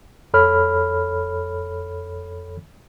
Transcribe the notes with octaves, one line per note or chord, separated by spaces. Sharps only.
F2 A4 C#5 B5 F6